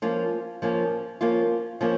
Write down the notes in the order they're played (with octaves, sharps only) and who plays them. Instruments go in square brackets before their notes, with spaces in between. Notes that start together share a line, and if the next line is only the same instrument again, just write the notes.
[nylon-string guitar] F3 A#3 C#4 F4
F3 A#3 C#4
F3 A#3 C#4 F4
F3 A#3 C#4